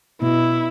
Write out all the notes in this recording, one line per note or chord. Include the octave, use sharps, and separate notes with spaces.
B2 E4